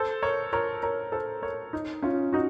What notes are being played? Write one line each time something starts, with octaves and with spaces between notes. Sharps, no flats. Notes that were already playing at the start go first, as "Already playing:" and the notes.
Already playing: A4 C5
A#4 C#5
A#4 C#5
A#4 C#5
A4 C5
A#4 C#5
D#4
C#4 F4
D#4 F#4